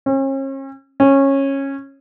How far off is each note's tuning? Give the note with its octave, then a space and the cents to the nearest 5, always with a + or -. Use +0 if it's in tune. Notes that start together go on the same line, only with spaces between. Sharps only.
C#4 -40
C#4 -15